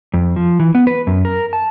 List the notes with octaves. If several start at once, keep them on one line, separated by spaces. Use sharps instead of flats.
F2
F3
E3
B3
B4
F#2
A#4
A5